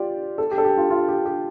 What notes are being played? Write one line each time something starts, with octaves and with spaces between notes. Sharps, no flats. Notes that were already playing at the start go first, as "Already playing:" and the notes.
Already playing: F4 G4 D5
A4
G4
A4
G4
F4
F4
G4
G4